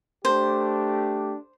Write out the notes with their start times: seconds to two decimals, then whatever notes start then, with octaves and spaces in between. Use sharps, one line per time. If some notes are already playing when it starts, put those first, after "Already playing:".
0.25 A3 D4 G4 C5